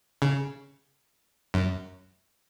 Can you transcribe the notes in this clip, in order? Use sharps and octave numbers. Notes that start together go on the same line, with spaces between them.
C#3
F#2